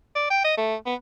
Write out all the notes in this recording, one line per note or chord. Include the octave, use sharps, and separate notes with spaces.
D5
G5
D#5
A3
B3